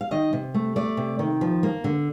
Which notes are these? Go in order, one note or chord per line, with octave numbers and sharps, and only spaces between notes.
F5
D#3 D#5
C3
A3
A3 D5
C3
D#3
F3
A#3
D3